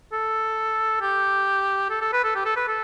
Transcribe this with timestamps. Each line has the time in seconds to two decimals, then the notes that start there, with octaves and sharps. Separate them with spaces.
0.12 A4
1.01 G4
1.90 A4
2.01 A4
2.13 B4
2.24 A4
2.35 G4
2.45 A4
2.56 B4
2.68 A4